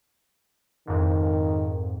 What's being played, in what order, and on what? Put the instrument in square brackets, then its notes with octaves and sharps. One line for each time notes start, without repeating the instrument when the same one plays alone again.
[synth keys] F2 G#2 [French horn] D#3